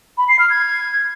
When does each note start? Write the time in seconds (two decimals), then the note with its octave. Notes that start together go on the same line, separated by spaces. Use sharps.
0.18 B5
0.28 C7
0.39 F6
0.50 G#6